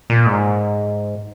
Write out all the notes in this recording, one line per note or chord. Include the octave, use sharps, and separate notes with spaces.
A#2
G#2